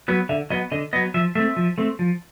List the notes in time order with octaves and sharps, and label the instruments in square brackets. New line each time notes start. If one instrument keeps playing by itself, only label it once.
[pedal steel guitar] F#3 B3
D3 E5
F#3 B3 D#5
D3 D#5
F#3 B3 D#5
F3 E5
A3 C4 E5
F3
A3 C4
F3